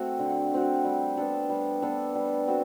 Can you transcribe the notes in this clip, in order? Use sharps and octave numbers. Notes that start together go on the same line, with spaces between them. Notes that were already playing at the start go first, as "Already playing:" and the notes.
Already playing: A3 C4 F#4
D3
A3 C4 F#4
G3
B3 D4 A4
G3
B3 D4 A4
G3
C4 F#4 A4